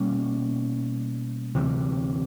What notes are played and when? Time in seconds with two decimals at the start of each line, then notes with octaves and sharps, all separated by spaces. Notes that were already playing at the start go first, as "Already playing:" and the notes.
Already playing: B2 G3 A#3 C#4
1.54 D2 C3 E3 G3